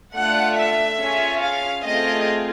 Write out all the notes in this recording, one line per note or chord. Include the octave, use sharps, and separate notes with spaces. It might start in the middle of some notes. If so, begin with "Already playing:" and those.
A3 D4 F4 F#5
E5
C#4 F4 G#4
F5
A3 C4 F4 G#4 D#5